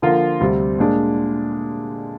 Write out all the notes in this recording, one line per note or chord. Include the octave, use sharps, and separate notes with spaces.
D3 F3 A#3 F4 A#4
D2 C3 G3 C4
A#2 G#3 D4